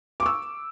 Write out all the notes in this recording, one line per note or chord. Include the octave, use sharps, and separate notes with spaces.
C#6 D6 E6